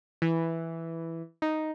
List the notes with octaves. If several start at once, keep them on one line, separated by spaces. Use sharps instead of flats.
E3
D#4